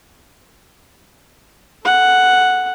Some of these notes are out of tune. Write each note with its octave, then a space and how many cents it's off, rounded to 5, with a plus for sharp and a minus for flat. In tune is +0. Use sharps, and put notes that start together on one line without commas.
A4 -5 F#5 +0